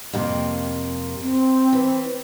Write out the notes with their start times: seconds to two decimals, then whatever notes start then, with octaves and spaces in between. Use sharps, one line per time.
0.13 F2 C3 A#3
1.22 C4
1.73 E3